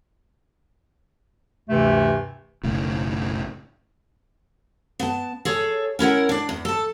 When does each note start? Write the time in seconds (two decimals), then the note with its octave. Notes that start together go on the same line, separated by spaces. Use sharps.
1.68 D2 G2 C3 E3 A3
2.63 F#1 B1 A2 C#3
5.00 B3 A5
5.45 G#4 A4 C#5
5.99 C#4 E4 A#4 F#5
6.29 D4 D5
6.49 E2
6.65 A4 A5